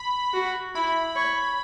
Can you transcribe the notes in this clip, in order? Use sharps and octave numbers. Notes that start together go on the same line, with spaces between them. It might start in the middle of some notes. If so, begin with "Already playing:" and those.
Already playing: B5
F#4
E4 B5
C#5